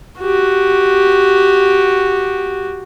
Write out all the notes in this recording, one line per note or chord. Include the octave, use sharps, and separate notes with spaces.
F#4 G4